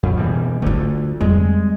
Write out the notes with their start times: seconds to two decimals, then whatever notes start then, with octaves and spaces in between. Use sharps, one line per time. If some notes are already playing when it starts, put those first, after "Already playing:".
0.03 F2
0.17 B2 E3 G3
0.62 D3 A3 D#4 F4
1.21 F2 G3 G#3